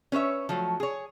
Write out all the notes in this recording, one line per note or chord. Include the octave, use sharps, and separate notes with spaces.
C#4 B4 C#5 E5
F3 F#3 A3
G#4 C#5